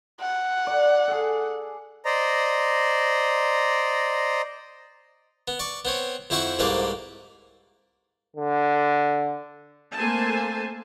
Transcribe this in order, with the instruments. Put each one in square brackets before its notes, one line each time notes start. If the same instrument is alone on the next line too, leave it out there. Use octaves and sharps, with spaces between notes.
[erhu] F#5
[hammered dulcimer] D5
G#4 A4
[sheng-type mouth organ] C5 D5 D#5 A#5
[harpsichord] B3
D5 C#6
B3 C4 C#5
F2 C4 E4 F#4 E5 C#6
C2 G#2 A3 A#3 B4 D5
[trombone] D3
[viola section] A3 A#3 C4 C5 G#5 A5